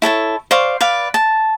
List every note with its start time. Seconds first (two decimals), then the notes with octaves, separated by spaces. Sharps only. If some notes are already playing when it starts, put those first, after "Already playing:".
0.02 E4 A4 C#5 A5
0.51 C5 D5 F5 C#6
0.81 B4 D5 F5
1.14 A5